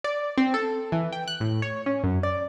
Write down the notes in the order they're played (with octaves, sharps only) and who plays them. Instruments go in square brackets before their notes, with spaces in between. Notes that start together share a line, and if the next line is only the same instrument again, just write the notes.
[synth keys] D5
C4
A4
E3
G5
F#6
A2
C#5
C#4
F#2
D5